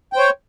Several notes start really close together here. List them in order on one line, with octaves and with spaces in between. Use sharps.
G5 C5 C#5